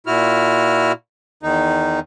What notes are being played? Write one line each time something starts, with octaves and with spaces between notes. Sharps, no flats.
A#2 E4 F#4 F6
E2 D#3 D#4